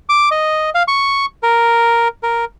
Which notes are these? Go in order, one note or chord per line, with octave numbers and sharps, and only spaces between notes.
D6
D#5
F5
C#6
A#4
A#4